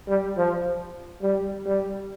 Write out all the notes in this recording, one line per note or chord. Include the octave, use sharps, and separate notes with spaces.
G3
F3
G3
G3